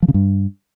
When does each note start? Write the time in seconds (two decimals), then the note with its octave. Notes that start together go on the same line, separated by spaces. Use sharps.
0.02 F3
0.08 C#3
0.14 G2